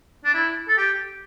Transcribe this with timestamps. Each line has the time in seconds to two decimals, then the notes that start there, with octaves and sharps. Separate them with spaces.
0.24 D4
0.34 E4
0.68 A4
0.77 G4